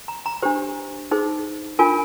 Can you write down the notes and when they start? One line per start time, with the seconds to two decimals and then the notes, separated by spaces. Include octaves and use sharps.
0.08 A#5
0.26 A#5
0.42 D4 G4 C5
1.11 D#4 G#4 C5
1.79 D4 F4 A#4 G#5